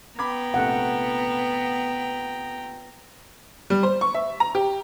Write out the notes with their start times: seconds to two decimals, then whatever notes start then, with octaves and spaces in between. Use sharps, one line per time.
0.19 B3 G5 A#5 B5 D6 G#6
0.54 A#1 C3 A3 F#5
3.70 G3
3.83 C5
4.01 C#6
4.15 E5
4.40 A#5
4.55 G4